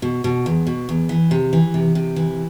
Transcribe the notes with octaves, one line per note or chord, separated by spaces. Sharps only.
B2
B2
E2
B2
E2
E3
C3
E3
C3
C3
E3